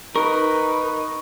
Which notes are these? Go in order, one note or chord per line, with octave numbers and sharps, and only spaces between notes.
D#4 A#4 B4 C#6